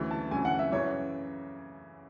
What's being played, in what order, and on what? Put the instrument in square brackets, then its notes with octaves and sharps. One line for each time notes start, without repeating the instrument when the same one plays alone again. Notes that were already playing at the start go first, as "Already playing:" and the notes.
Already playing: [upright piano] D2 C#3 E3
A5
D2 C#3 E3 G#5
F#5
E5
F#2 C#3 E3 C#5